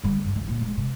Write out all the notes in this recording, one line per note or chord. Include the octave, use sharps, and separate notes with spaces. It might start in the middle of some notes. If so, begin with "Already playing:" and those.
D3 G3
C#2 G2
G#1 D#3
A#2 D3
G3 G#3
C3